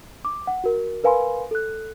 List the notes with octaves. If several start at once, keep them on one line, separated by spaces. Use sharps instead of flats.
D6
F#5
F#4 A#4
A#4 B4 F5 G#5 B5 C6
A4 F#6